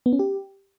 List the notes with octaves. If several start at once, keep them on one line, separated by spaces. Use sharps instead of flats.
B3
C#4
G4